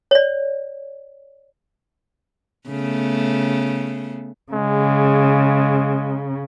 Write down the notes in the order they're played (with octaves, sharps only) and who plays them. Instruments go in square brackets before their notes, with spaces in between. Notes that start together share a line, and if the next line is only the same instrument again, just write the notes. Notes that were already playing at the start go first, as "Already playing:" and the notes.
[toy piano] C#5 D5
[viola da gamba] C#3 A3 B3
[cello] C#3 [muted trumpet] G#3